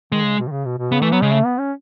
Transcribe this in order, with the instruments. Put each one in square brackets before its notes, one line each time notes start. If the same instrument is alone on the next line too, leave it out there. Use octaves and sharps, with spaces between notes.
[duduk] D#3 [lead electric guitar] G#3
[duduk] C#3
B2
D#3
C#3
B2
B2
[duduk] C#3 [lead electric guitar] B3
[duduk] E3 [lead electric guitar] A3
[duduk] F#3 [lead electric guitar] B3
[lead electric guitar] C#3 [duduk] G#3
[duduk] A3
B3
C#4